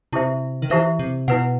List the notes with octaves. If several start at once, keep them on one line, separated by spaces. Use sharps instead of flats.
C3 E4 G4 C5 E5
D#3
E3 E4 G4 C5 E5
C3
B2 E4 B4 F#5